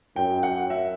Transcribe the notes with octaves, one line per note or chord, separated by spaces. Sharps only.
F#2 G5
F#5
E5